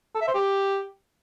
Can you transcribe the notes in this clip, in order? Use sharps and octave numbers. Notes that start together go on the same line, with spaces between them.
A4
E5
C5
G4